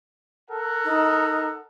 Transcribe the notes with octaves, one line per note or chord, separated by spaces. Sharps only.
A4 A#4 F#5
D#4